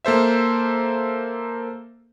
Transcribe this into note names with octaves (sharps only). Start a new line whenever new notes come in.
A#3 A4 C5 E5